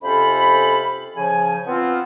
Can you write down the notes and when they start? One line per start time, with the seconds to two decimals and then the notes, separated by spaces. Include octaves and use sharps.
0.03 F2 C3 C#4 A4 C5 B5
1.16 C#3 F3 G#5
1.67 B3 C4 F4